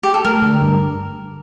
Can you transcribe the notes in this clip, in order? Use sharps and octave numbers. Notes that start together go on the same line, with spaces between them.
G4
A4
A3 A#4
D3
G2